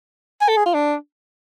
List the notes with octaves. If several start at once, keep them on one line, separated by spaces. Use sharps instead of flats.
G#5
A4
G#4
F4
D4